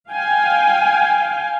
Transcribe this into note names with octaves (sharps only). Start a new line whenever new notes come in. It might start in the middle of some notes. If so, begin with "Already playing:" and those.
F5 G5 G#5